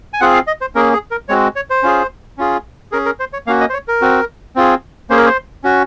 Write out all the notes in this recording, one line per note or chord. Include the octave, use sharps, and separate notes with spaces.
G#5
C4 F4 G#4 F#5
F5
D#5
C5
A#3 C#4 G#4 A#4
G#4
A#4
G#3 C4 F#4 C#5
C#5
C5
C#4 F4 G#4
C#4 F4 G#4
C#4 G#4 A#4
A#4
C5
C#5
A#3 C#4 F#4 F5
D#5
C5
C#5
A#4
C4 F#4
C4 F4 G#4
A#3 C#4 G#4 C5
A#4
C5
C#4 F#4